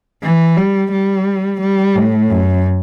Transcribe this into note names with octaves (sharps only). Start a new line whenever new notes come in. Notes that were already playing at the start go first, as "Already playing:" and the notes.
E3
G3
G3
G3
A2
F#2